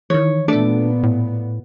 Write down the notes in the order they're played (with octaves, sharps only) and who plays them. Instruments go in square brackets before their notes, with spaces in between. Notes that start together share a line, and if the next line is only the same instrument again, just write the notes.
[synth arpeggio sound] D#3 E3 [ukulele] C#5
[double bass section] A#2 B3 [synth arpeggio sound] A3 A4 [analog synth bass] D4 [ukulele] D5
[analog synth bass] A2